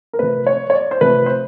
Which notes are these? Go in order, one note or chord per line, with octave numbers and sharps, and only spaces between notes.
A#4
C3 F3 A3 B4
C#5
C#5
D5
C5
C3 F3 A3 B4
C5